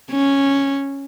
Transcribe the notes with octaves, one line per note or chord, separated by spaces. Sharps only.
C#4